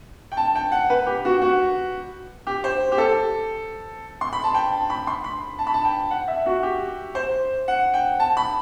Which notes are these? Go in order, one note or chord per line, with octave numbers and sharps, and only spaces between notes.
G5
A5
G5
F#5
B4
G4
F#4
F#4
G4
C5
G4
A4
C6
B5
A5
G5
A5
B5
C6
B5
A5
B5
A5
G5
F#5
E5
F#4
G4
C5
F#5
G5
A5
B5